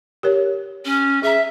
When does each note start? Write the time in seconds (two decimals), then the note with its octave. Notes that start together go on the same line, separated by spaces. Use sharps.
0.23 G4 A#4 C#5
0.85 C#4
1.23 G#4 E5 A#5